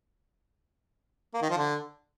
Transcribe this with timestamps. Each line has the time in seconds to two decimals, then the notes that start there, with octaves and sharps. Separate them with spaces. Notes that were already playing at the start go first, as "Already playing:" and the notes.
1.34 A#3
1.42 D#3
1.50 F3
1.58 D3